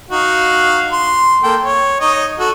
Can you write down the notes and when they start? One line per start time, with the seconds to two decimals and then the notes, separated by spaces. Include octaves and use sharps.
0.11 D#4 F#4 F5
0.93 C6
1.43 A#3 A4 G5
1.64 C#5
2.01 D#4 C#5 D#5
2.39 F#4 A4